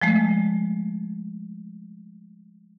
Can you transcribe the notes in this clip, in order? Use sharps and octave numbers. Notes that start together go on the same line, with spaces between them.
F3 G#3 A3